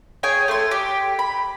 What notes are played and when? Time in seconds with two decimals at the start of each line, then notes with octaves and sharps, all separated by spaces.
0.23 G#4 C#5 G5 G#5
0.48 A3 C6
0.71 G4
1.19 B5